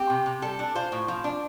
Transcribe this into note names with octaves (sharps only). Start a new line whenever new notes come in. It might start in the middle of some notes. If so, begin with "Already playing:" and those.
Already playing: C4 G4
C3
C3
G3 A4
D4
F4 C5
A2
F3
D4